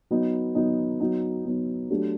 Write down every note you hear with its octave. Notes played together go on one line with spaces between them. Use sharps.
F#3 B3 D#4
F#3 B3 D#4
F#3 B3 D#4
F#3 B3 D#4
F#3 A3 D4 G4